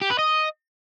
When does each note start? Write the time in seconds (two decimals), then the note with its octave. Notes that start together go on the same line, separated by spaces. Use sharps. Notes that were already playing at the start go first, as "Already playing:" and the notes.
0.01 G4
0.10 B4
0.19 D#5